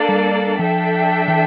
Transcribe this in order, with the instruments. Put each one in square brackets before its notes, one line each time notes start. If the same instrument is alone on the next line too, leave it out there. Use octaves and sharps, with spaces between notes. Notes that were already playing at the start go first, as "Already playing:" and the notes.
Already playing: [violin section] A#3 D4 A4 D5
[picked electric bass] G3
[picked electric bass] F3 [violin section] D4 A4 E5 G5
[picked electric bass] E3